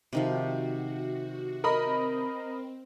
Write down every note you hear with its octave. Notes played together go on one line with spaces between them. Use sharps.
C3 D#3 F3 F#4
C4 A#4 D#5 B5